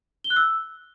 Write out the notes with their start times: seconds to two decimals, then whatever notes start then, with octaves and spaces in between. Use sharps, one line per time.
0.24 G7
0.30 F#6
0.36 E6